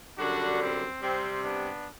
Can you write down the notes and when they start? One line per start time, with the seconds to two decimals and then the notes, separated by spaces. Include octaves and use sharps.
0.18 F#2 D3 G3 D4 F#4
0.61 C4
1.02 C3 G3 C4
1.44 B3 D4